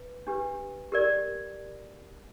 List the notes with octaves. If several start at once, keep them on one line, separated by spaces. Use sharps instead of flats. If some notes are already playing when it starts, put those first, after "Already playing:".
Already playing: B4
D4 G4 B4
G4 A#4 D5